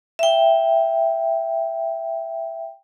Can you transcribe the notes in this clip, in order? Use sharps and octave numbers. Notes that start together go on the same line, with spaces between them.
E5 G5